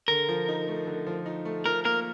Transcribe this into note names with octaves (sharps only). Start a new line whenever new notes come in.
D3 A#4
F3
D#4
A3
D3
F3
D#4
A3
F3 A#4
A#3 A#4